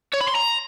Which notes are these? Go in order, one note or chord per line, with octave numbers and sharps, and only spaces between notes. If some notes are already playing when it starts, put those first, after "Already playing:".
C#5
B5
C6
A#5